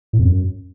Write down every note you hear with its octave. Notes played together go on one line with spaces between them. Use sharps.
A2
F2
F#2